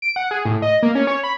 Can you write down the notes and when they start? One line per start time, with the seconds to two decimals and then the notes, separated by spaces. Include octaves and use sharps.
0.02 D7
0.16 F#5
0.31 G#4
0.45 A2
0.62 D#5
0.83 A#3
0.95 C#4
1.07 C#5
1.23 B5